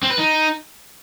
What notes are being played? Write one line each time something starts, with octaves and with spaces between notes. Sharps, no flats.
C4
B4
D#4